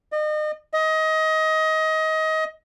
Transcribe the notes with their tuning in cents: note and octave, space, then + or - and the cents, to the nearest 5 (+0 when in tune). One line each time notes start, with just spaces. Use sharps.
D#5 -35
D#5 +25